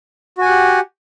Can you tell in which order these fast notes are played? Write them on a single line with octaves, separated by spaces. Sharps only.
F#4 G#5 F#5 G4